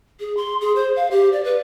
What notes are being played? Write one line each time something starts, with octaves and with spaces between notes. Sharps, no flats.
G#4
C6
G#4
C5
F5
G4
D5
B4